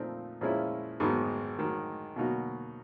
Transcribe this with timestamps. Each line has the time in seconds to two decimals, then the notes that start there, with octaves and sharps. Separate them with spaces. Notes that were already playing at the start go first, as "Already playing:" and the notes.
Already playing: A#2 F3 A3 C4 D#4
0.41 A#2 F3 G#3 C#4 E4
1.00 G#1 G#2 D#3 F#3 B3
1.58 G#2 D#3 F#3
2.16 B2 F#3 A#3 D#4 F#4